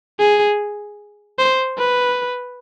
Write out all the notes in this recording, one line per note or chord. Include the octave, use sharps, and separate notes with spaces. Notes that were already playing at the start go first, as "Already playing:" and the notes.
G#4
C5
B4